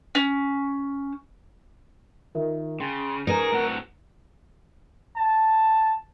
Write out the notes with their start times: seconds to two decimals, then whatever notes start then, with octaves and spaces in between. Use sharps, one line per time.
0.15 C#4
2.35 D#3 F4 A#4 E5
2.80 C#3 G5 C6 A6
3.27 C#4 D#4 G#4 A#4 B4 A#5
3.52 A2 C4 F#4 F#5
5.16 A5